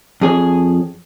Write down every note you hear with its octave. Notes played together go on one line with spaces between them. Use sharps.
F2 G#4 C#5